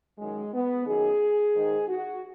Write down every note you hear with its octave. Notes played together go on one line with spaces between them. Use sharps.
F#2 D#3 G#3
B3
F#2 D#3 G#4
G#2 D#3
F#4